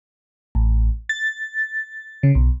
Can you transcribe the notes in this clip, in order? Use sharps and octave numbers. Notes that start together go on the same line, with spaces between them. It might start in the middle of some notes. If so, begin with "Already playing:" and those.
A1
A6
C#3
B1